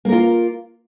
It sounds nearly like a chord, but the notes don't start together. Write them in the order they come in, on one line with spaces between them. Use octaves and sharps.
A#3 A#4 F4